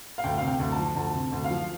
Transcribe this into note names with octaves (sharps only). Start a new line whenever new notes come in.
F5
D2 G5
C3 F5
G5
D2
A5
F3
D2 A5
C3
D2
F5
F3